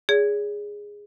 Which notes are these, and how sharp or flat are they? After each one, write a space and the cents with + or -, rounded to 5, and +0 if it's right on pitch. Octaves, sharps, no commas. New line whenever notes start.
G#4 -10 C#5 +45